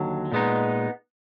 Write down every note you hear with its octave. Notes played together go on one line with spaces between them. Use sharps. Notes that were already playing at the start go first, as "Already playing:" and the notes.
Already playing: D#2 D3 F#3
A#2 G#3 B3 D#4